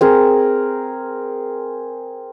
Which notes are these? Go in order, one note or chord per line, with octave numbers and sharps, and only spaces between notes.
C4 G#4 A#4